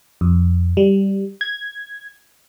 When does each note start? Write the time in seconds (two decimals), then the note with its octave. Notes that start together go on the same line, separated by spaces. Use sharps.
0.21 F2
0.77 G3
1.41 G#6